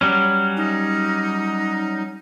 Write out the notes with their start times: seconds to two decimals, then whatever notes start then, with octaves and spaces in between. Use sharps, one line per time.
0.01 F#3 G3 C#4
0.57 D#4